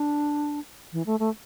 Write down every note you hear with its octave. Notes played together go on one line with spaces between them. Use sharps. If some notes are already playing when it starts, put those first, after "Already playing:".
Already playing: D4
E3
A3
A3